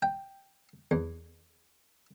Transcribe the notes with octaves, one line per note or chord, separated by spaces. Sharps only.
G5
E2